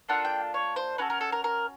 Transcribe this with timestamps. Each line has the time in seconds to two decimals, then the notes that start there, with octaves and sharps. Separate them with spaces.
0.09 A#3 D4 F4 A4 F#5
0.25 G5
0.54 C#5
0.76 C5
0.98 C#4 F#4 A4 B4
1.10 A#4
1.21 A4
1.32 A#4
1.44 A#4